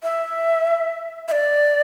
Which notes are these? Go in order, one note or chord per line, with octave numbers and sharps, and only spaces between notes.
E5
E5
D5